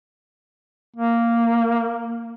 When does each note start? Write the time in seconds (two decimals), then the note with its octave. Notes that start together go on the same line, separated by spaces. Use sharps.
0.97 A#3